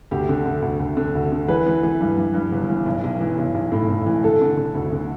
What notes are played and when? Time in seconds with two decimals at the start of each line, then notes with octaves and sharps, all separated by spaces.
0.11 D2 G4
0.29 D3
0.46 D3
0.62 D2
0.80 D2
0.97 D3
1.15 D2
1.32 D3
1.48 E3 B4
1.66 E3
1.83 E3
2.01 G2
2.17 G2
2.34 G2
2.52 G1
2.69 E3
2.86 B1
3.04 B1
3.20 E3
3.38 B1
3.54 B1
3.72 A2
3.90 A2
4.06 E3
4.24 D3 A4
4.41 D3
4.57 D3
4.75 D2
4.92 D3